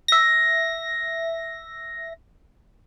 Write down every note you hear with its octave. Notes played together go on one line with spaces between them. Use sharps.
E5 A#6